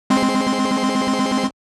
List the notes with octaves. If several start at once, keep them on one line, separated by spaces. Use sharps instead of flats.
G#3 C4 C6